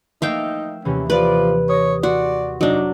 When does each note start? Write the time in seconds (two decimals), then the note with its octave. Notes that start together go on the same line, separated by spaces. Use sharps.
0.22 F3 A3 A#3 D#4 E5 F5 G5
0.85 D#2 C3 E3 C#4
1.10 F3 B4 D5
1.69 C#5 D#6 A#6
2.03 F#4 D5 C6
2.61 F1 F#3 D4 D#4 D6